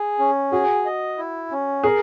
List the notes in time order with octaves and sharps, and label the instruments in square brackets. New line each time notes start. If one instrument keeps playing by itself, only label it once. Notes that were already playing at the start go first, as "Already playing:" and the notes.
Already playing: [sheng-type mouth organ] G#4
C#4
[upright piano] F#4 [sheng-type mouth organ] G#4
[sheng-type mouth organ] D#5
E4
C#4
[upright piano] G#4 [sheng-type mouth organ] A#4